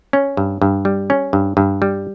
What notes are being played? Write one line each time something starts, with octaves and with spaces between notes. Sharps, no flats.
C#4
G2
G2
G3
C#4
G2
G2
G3